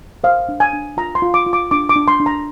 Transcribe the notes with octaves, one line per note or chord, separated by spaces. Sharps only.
C5 F5
D4
G#5
D4
F4 A#5
C6
F4
D6
F4
D6
D4 D6
D6
D4
C6
D4
A#5